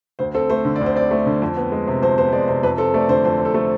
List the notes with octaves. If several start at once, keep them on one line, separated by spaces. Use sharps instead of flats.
D2 C5
C4 A4
A3 C5
D3
D5
D2
C5
C4 D5
A3
D3
F2
B3
G#3
C3
F2 C5
B3 C5
G#3 D5
C3 C5
F2 B4
C4 A4
A3 D5
D3 C5
F2 C5
C4
A4
A3